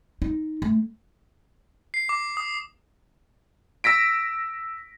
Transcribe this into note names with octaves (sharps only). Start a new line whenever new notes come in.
D#4
A3
C7
D6
D#6
E6 A#6 B6 D7